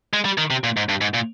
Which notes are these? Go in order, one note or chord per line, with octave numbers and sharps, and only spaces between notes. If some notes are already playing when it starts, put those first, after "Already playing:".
G#3
G3
D#3
C3
A#2
G#2
G2
G#2
A#2